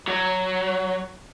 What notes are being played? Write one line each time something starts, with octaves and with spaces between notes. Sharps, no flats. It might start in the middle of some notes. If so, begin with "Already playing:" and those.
F#3